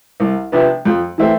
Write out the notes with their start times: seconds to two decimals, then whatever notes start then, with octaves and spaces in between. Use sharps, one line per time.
0.20 C2
0.52 C3 F3 B3 D4
0.85 F2
1.18 E3 A3 C4